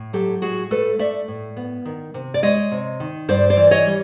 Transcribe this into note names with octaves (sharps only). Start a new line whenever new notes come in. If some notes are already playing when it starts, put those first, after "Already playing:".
Already playing: A2
F#3 G4 A4
A2 F#4 G#4
A3 A4 B4
A3 D5 E5
A2
B3
D#3
C3
D5
G#3 C#5 D#5
C3
D#3
G2 C5 D5
C5 D5
E3
C#5 D#5
G3